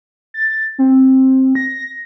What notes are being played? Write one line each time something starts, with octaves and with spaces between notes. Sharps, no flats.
A6
C4
A#6